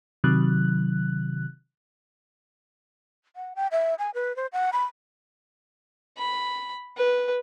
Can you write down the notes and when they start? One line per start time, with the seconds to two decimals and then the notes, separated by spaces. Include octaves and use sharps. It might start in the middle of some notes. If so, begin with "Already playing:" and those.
0.24 C3 D#3 F#3 F#6
3.36 F#5
3.56 G5
3.72 E5
3.99 G#5
4.14 B4
4.36 C5
4.53 F#5
4.73 B5
6.18 B5
6.97 B4